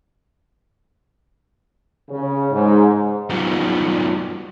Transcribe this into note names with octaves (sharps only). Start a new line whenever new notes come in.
C#3
G#2
F#2 G3 B3 D#4 F4 F#4